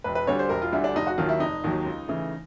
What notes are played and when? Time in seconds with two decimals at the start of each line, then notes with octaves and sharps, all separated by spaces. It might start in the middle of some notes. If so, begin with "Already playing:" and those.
0.04 E1 B4
0.15 B4
0.27 D2 D3 G3 C#5
0.39 C5
0.49 E1 A#4
0.62 F4
0.72 D2 D3 G3 E4
0.84 D4
0.95 F1 D#4
1.07 F#4
1.18 D#2 D#3 F#3 F4
1.29 E4
1.40 F1 D#4
1.64 D#2 D#3 F#3
1.86 C#2
2.08 C#3 E3 A3